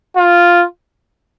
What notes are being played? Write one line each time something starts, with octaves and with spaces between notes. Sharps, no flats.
F4